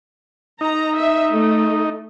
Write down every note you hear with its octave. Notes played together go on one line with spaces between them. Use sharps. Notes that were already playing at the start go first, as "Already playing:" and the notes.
D#4 A#5
E5
A3